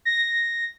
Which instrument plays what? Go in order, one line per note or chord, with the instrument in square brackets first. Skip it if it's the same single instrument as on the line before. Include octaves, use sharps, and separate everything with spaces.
[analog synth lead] A#6